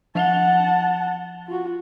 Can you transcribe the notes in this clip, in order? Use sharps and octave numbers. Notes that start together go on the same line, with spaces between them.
F3 F#5 A5 F7 G7
F4 F#4